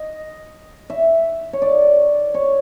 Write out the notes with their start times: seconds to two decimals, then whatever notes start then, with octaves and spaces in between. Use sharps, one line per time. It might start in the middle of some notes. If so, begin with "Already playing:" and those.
Already playing: D#5
0.90 E5
1.53 C#5
1.62 D5
2.34 C#5